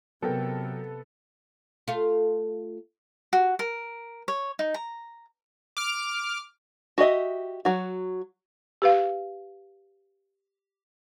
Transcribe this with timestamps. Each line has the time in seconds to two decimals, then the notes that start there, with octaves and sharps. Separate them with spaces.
0.22 C3 F#3 B3 A4 A#4 G5
1.88 A3 F4
3.33 F#4
3.59 A#4
4.28 C#5
4.59 D#4
4.74 A#5
5.77 D6 F6
6.98 F#4 G4 D#5 E5
7.65 F#3 F#4
8.82 G4 B4 F5